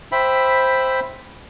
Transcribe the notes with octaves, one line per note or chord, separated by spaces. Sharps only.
C5 E5 G5 B5